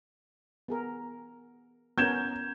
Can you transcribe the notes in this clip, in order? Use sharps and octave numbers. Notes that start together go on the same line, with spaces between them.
B3 G#4 A#4
B3 C#4 A#4 G6 G#6 E7